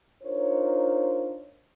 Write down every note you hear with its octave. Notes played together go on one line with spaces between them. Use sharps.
D4 D#4 F4 A#4 C5 C#5